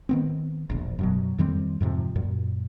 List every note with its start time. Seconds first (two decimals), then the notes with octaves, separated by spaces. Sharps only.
0.09 D#3 B3 C4
0.70 E1 A#1
0.99 F#2 B2 F#3
1.38 F2 D#3 G3 C4
1.80 F2 G#2 C3 F3
2.16 F#2 A#2